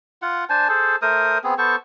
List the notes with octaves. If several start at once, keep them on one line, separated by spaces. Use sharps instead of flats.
F4 F#5
D4 C5 G#5 A5
G#4 A4 C5
A3 A#4 C5 D#6
B3 C4 G#4
B3 A4 C5 C#6